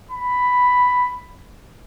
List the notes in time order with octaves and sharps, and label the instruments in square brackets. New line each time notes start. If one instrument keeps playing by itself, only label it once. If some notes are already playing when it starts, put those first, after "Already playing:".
[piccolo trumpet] B5